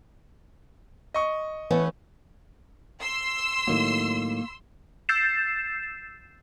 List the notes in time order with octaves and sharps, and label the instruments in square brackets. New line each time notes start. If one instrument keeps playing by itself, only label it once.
[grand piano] D#5 C#6
[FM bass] E3 [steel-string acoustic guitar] A3 B3 C#4 [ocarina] B4
[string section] C6 E6
[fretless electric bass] A2 D#3 F#3 [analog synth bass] A#3
[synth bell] E6 G6 A6 C7 E7